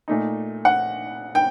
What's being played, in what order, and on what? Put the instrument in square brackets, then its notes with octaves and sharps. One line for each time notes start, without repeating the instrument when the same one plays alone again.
[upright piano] A#2 A3 D#4
F#5
G5